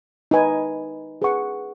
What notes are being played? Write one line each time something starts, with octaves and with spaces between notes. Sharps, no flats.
D#4 B4 G#5
G#4 B4 F#5 C#6